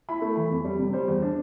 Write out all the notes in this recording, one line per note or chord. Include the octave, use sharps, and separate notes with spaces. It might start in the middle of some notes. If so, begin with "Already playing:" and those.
E4 B5
A3
E3 B5
F2
G3
C3
G3 C5
E2
D4